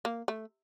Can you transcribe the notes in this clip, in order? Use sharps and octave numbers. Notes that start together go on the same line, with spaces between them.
A#3
A3